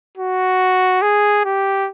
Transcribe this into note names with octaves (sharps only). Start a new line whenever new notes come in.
F#4
G#4
G4